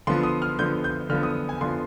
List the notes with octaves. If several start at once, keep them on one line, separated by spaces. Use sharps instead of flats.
D3 F3 B3 C6
D#6
F6
D3 F3 B3 G6
G6
D3 F3 B3 F6
D#6
G#5
D3 F3 B3 C6